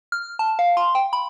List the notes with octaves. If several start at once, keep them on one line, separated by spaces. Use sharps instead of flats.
F6
A5
F5
C6
G5
B5